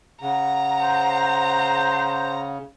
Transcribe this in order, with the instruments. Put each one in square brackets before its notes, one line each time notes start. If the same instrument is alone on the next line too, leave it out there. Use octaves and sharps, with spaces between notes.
[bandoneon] C#3 [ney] F#5 [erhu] A#5
[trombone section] C5